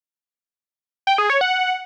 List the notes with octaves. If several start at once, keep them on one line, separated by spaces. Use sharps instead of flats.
G5
G#4
C#5
F#5